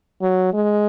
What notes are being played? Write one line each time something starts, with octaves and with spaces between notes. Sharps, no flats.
F#3
G#3